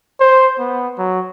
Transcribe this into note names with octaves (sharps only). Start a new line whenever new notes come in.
C5
B3
F#3